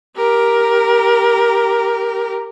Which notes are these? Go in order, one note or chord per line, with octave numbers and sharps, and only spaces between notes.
G4 A#4